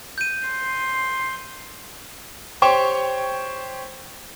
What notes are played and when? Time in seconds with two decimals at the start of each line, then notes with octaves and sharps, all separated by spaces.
0.18 G6 D#7
0.48 C6
2.62 G4 C5 C#5 G5 C#6